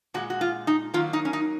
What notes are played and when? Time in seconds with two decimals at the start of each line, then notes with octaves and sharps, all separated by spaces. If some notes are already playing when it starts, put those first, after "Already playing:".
0.14 A#2 G#3 F#4
0.30 F#4
0.41 F4
0.67 D#4
0.94 D#3 F#3 A#3 F4
1.13 D#4
1.25 C#4
1.33 D#4